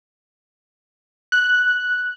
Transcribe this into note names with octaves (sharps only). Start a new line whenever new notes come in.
F#6